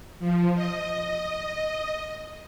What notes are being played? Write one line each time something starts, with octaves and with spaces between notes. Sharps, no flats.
F3
D#5